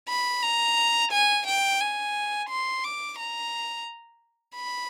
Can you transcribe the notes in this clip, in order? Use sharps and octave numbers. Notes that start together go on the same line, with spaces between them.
B5
A#5
G#5
G5
G#5
C6
D6
A#5
B5